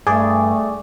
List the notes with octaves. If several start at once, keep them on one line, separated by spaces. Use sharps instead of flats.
G2 A3 G#4 D5